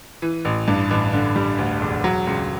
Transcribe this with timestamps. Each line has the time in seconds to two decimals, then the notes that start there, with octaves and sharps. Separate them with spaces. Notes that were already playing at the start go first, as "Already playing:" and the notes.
0.22 E3
0.45 A1
0.68 G2
0.91 A1
1.13 D3
1.36 G3
1.58 D2
1.81 E1
2.04 F#3
2.27 C#2